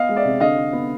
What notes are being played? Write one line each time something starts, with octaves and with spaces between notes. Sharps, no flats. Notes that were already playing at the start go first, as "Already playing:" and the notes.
Already playing: B3 D#5 F5
G#3
D5 E5
C3
D3 D#5 F5
D3
B3